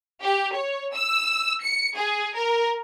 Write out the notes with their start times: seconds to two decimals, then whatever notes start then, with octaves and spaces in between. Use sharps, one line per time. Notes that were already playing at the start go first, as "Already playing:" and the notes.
0.22 G4
0.54 C#5
0.94 E6
1.63 C#7
1.97 G#4
2.36 A#4